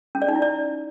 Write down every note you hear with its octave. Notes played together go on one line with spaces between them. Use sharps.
C#4
D5
D#4
E4
D5